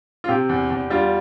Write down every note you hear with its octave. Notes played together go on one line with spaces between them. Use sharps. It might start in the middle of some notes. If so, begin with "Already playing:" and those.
F4
C3 G4
E2
E2
G3 F4